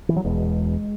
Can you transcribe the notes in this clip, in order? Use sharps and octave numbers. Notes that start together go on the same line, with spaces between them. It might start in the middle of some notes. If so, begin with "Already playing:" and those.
E3
F#3
E1 E2 B2 G#3